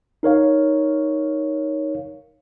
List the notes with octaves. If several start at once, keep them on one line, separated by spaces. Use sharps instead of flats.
D#4 A#4 C#5 F5